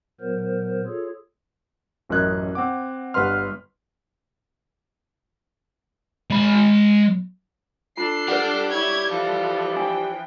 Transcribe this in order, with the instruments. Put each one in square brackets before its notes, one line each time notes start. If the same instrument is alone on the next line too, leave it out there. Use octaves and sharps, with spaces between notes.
[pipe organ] A#2 F#3 B3 A#4 C5
F4 G#4 A4 C#5
[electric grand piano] A1 F#2 A#4 D#5 F#6 G#6
C4 F#5 D6
G1 G2 B4 F#5 C6 F6
[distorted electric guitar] G#3 B5
[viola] D4 A4 [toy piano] F4 [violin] C7
[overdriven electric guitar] G4 D5 [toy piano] B4 F#5
[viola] E4 C#5 [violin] G#6
[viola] E3 F3 [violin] F4 A4
[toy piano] D4 [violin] G5